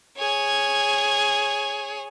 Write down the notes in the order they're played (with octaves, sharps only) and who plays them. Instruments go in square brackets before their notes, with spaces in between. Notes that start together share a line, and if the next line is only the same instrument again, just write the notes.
[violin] G#4 C#5